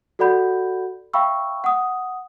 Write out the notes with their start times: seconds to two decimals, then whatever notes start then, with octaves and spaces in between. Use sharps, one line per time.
0.19 F#4 A4 D5 F#5 B5 G6
1.13 E5 F5 G5 B5 C#6 E6
1.64 F#5 D#6